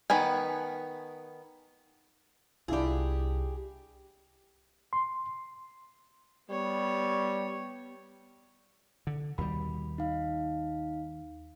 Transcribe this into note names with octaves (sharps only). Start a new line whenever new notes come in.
D#3 B3 B4 G#5
C2 D4 E4 F4 G4 G#4
C6
G3 B3 C#5
D3
D#2 B2 G3 B5
D#4 F5